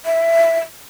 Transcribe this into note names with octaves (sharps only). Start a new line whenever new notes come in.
E5